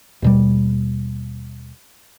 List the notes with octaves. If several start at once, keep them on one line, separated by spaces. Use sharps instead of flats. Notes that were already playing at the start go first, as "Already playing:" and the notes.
D#2 B2 G3